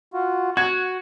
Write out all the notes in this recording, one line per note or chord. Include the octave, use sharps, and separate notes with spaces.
F4 F#4
F#4 F#5 G#6